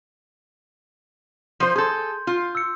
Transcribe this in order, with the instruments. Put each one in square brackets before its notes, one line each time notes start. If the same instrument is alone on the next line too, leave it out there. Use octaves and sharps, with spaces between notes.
[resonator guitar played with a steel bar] F3 C5
[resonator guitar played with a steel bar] G#4 A4 [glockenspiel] C6 G6
[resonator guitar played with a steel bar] F4
[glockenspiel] E6 C#7